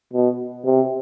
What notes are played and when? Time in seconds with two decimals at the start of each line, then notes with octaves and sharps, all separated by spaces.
0.13 B2
0.65 C3